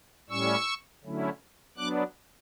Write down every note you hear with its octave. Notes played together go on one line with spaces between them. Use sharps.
A2 G3 C#4 C#6 E6
D3 F#3 A3 C#4 E4
F#3 B3 D4 D6 F#6